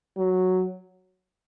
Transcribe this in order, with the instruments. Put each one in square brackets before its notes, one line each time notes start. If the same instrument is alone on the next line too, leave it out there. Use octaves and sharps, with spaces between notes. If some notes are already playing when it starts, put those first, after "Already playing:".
[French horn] F#3